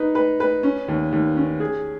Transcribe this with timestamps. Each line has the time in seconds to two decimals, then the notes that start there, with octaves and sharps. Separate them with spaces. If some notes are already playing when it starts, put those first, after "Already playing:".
Already playing: D#4 B4
0.15 B4
0.40 B4
0.63 C#4
0.88 D#2
1.12 D#2
1.36 C#4
1.60 G#4